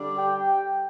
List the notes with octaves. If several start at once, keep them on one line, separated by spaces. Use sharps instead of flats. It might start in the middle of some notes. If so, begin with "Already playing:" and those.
Already playing: D3 G3 D4
G4 G5